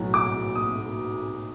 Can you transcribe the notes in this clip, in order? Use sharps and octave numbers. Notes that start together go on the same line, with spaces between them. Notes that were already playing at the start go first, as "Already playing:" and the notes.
Already playing: B1 A2 F#3
D6
D#6